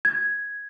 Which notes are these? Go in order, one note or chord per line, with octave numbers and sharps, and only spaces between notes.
G#6